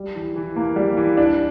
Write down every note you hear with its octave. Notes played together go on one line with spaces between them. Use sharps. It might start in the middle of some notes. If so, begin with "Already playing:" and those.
Already playing: G3
E3
E3
A#3
G3
E3
D4